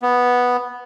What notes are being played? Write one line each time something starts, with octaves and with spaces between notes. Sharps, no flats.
B3